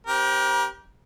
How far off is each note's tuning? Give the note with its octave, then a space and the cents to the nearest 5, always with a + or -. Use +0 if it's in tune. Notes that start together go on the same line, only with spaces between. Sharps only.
C4 +35 G4 -10 A#4 +40